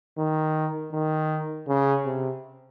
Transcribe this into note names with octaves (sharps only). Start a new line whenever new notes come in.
D#3
D#3
C#3
C3